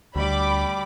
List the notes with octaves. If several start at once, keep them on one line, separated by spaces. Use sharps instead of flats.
D2 G3 B5 D6